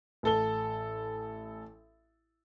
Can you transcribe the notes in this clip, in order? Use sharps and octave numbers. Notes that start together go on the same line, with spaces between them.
A1 A4 G7